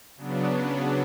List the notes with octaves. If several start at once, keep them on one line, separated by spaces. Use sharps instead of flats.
C#3 F#3 B3 D4